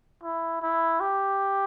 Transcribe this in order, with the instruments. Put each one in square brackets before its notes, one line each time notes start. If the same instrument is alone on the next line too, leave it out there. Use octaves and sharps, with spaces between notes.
[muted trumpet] E4
E4
G4